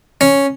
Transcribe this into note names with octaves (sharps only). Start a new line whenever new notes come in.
C#4